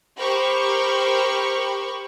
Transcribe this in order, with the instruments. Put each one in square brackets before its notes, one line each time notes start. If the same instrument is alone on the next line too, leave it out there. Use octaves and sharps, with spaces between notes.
[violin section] G4 A#4 C5 B5 C#6